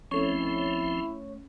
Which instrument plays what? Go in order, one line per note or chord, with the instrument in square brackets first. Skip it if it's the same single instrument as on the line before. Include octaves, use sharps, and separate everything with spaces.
[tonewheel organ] G#1 F3 C4 [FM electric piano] A3 C#5 [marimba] C#4 [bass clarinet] E4